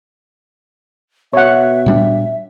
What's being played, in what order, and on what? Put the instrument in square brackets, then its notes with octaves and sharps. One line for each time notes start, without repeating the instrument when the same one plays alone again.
[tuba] B2 [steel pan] C#5 F#5 [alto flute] E5
[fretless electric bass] A#2 G3 D4